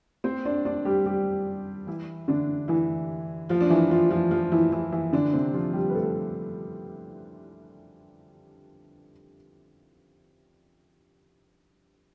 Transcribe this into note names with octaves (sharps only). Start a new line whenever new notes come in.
C4 C5
D4 D5
D4 D5
G3 G4
G3 G4
E3 E4
D3 D4
E3 E4
F3 F4
D4
E3 E4
F3 F4
F3 F4
F3 F4
E3 E4
E3 E4
E3 E4
D3 D4
C3 C4
F3 F4
G3 G4
B4
A3 A4